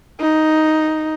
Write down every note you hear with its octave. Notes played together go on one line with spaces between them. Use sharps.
D#4